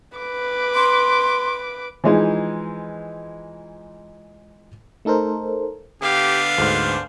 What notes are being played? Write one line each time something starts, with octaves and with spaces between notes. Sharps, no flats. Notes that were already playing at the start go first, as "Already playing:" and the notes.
B4 D6
C6
E3 F3 G#3 D#4
A3 D#4 A4 A#4 C5
D3 B3 D4 G4 F5
D2 G#2 C5 F6